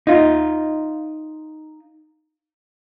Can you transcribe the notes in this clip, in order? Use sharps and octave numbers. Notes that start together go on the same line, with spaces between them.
D#4 F4